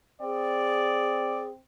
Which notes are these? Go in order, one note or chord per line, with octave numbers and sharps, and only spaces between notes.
C4 G#4 D5